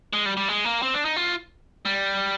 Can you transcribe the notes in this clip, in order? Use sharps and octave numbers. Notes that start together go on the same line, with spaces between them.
G#3
G3
G3
G#3
A#3
C4
D4
D#4
F4
G3